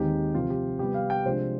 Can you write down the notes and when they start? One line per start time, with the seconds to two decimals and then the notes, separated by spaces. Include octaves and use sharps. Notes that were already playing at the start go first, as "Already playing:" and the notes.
Already playing: D#2 D#3 G#3 C4 G4
0.34 C3 F3 C4 F4
0.50 G4
0.79 C3 G3 B3 G4
0.94 F5
1.10 G5
1.25 C3 F3 G#3 D4 C5